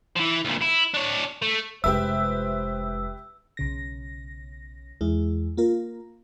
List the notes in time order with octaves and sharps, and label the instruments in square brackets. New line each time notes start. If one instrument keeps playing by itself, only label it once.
[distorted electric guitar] E3 F3
D2 A#2
E4
D4 C#5
A3
[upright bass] F1 G#3 [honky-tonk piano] G4 B4 E5 [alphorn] C5 [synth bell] E6
[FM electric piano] B1 C#3 A#6
E2 G#3 E4
A#3 F4 A#4